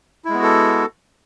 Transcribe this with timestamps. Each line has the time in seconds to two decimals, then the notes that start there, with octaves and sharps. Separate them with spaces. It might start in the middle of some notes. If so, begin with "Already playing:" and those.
0.25 E4
0.29 G#3
0.34 B3
0.38 F#4
0.43 A4